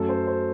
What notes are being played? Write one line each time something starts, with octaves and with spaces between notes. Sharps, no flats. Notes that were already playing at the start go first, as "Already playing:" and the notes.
Already playing: F#2 F#3 A3 A4
C5
C5